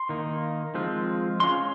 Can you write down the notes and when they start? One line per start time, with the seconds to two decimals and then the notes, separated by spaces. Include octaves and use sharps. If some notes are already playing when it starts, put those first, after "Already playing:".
Already playing: C6
0.09 D#3 A#3 D#4
0.75 F3 G#3 C4 F4
1.40 G#3 C#4 F4 C6